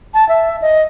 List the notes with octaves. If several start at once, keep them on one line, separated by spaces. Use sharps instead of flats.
A5
E5
D#5